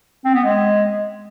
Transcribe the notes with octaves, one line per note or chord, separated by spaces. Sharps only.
C4
B3
G#3